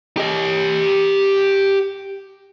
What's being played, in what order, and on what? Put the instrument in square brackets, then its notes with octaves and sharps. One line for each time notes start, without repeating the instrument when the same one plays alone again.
[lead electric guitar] G4 D#5